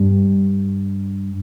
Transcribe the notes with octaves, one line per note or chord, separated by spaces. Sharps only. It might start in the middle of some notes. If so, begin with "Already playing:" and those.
Already playing: G2